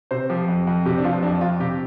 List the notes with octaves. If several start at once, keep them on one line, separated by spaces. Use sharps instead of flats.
C3 C5
F3 G4
F2
F2
C3 G4
D4
F3 F4
F2 D4
F2 F4
C3 G4